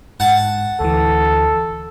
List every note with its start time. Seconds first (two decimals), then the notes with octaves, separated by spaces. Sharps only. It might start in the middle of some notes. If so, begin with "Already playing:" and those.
0.20 G#2 F#5 A5
0.80 D2 E3 A4